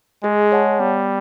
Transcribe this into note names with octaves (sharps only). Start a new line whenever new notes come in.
G#3 G#4
C#5 F#5 A5
G3 B3